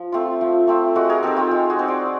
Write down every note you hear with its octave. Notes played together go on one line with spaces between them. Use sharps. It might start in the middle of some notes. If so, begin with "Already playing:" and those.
Already playing: F3
A3 C4 F4
F3
A3 C4 F4
G#3 F#4
G#4 A#4
C4 D#4 G4 A4
F4 G4
G#3
F#4 G#4
C4 D#4
C5 D5